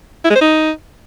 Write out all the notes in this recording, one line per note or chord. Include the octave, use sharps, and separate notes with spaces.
E4
G#3
C5
D#4